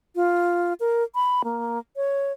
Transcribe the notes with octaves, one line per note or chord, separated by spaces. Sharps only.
F4
A#4
B5
A#3
C#5